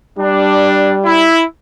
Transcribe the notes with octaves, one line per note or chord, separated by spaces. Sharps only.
G3 D4
E4